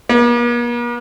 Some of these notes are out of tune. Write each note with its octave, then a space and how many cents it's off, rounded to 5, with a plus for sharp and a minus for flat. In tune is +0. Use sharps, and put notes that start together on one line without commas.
A#3 +45